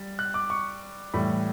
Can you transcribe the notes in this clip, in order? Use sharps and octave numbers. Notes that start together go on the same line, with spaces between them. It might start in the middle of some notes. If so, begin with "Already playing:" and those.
Already playing: G3
F#6
D6
C#6
A2 E3 G3 B5